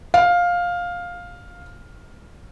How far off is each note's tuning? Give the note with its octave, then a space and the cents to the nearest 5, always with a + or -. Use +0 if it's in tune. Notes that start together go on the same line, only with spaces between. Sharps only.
F5 +10